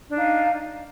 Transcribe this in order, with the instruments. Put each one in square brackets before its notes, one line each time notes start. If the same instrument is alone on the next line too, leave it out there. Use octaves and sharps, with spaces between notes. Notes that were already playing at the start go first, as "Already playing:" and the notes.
[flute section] D4
D#4
F5